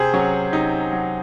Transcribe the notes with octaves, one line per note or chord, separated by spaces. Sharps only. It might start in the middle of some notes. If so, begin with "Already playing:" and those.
Already playing: C3 G#4 C5
F#3 C#4
C3 D#4
F#3